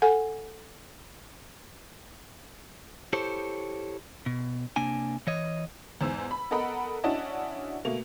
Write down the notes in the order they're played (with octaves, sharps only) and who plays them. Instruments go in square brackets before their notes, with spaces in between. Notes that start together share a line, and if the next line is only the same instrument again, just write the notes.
[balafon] A4 F#5 G#5
[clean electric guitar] E4 G4 A4 C5 C#5
B2
C3 A#3 D4 G#5
E3 C#5 D#5
[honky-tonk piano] E2 G#2 C5 E6
B5
B3 A4 A#4 D#5 F#5 B5
C#4 D4 E4 F#4 D#5 A5
B2 A3 A#3 F7